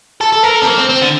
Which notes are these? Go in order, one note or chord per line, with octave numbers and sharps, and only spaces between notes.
A4
A4
A#4
A4
C4
A#3
C4
C4
D3